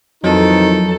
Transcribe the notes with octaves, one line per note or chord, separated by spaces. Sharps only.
F2 D#3 E3 F#3 D#4 A4